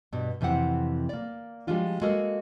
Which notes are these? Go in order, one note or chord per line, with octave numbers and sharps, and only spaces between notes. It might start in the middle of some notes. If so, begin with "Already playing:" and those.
G2 B2
F2 C3 E3 C4 F#5
A#3 D5
F3 G3 G#3 D4 F4 F#4
G#3 A#3 F#4 A4 A#4